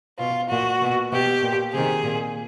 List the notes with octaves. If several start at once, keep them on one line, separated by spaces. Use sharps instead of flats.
B2 F4
A#2 F#4
B2
B2 G4
A#2
C3 D#3 G#4
A#2